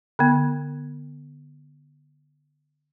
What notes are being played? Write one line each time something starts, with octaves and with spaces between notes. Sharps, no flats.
D3 B3